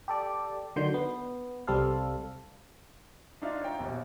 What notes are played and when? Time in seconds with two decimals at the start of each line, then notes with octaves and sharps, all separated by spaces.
0.08 G4 A4 D5
0.76 D3 D#3 F#3 C6 G6
0.94 B3
1.67 C2 G3 C4 A4 F5
3.42 D4 D#4 F4 E5 F5
3.61 C#5 F5 G5 A#5
3.79 A#1 D#2 B2